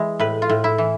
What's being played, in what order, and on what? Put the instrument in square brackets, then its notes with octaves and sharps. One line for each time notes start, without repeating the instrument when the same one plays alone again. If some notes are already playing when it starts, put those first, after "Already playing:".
Already playing: [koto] E3 G#3 E4
A2 B4
F4
A2
E4
E3